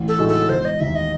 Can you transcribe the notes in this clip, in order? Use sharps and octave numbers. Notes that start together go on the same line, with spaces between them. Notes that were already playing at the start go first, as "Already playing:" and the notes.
Already playing: A1
A4
A2 G#3 D#4 F#4
A4
E1 C5
D#5
D#2 D#3 E5
D#5